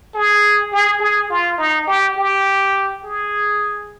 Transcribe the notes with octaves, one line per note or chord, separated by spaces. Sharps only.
G#4
G#4
G#4
F4
D#4
G4
G4
G#4